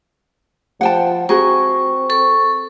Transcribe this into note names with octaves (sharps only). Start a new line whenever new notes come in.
F3 F#5 G5 A5
C4 F#4 G#4 A#4 C#6
A4 C#6